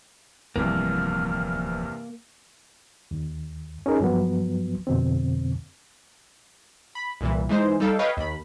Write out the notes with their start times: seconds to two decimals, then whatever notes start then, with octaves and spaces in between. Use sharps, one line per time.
0.56 D1 E2 G2 C3 E3 F3 A#3 F6
3.11 D#2
3.86 C#4 D#4 G#4 A#4
4.01 G2 F3 F#3 B3
4.87 F2 B2 D3 C4
6.95 B5
7.21 C2 A#2 E3
7.49 E3 G#3 D#4 C5
7.80 G3 D#4 A4 F5 G5
7.99 B4 C#5 D#5 F5 G5
8.17 D#2 B5